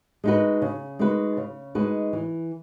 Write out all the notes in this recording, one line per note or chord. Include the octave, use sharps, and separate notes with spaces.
G#3 D#4 F#4 B4
C#3
G#3 D#4 F#4 B4
C#3
G#3 D#4 F#4 B4
E3